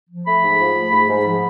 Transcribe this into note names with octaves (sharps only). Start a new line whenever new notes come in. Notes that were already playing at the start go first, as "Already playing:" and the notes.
F3
A3 B5
G#2
F3
A3
G#2
G#2
F3